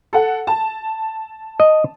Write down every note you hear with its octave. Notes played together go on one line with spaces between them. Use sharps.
A4 F#5
A5
D#5